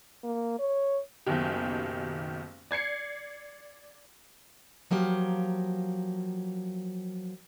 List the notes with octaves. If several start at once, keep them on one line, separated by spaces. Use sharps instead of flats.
A#3
C#5
F#1 B1 B2 D#3 G4
D5 G#6 C7 C#7
F3 F#3 A#3 G4